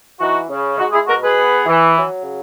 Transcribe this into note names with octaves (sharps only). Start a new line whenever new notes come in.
E3 D#4 F#4
C#3
G#3 D#4 F#4
E4 G#4
B2 F#4 A#4
G#4 B4
B3
E3
F#3
C#3